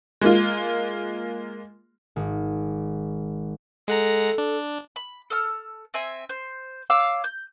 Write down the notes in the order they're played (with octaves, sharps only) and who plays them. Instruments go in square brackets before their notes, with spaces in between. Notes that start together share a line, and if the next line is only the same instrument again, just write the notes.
[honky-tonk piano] G#3 A#3 F4
[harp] G#1
[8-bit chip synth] G#3 F#5 A#5 [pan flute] A4
[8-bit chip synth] D4
[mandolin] B5
A4 E6 F6
C4 E5 G#5
C5
C#5 F5 D6 E6
G6